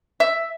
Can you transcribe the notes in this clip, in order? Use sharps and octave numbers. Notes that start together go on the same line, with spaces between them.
E5